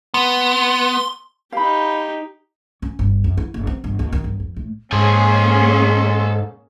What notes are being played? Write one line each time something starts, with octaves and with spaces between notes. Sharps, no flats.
B3 C6
D#4 G4 F5 B5
C#4
G1
F#2
E4
F#1
C4
G1
D#2
D#3
G1
F2
A2
G#2 A#3 C#4 G#4 A4 G#5 C6